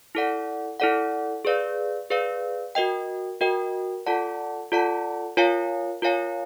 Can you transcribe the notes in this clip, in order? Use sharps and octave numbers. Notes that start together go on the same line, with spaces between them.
E4 A4 D5 F#5
E4 A4 D5 F#5
G#4 B4 D5 F5
G#4 B4 D5 F5
F#4 A#4 D#5 G5
F#4 A#4 D#5 G5
F4 A4 D5 F#5 A5
F4 A4 D5 F#5 A5
F4 A#4 C#5 F5 G#5
F4 A#4 C#5 F5 G#5